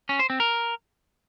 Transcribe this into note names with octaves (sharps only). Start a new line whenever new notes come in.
C#4
C5
C4
A#4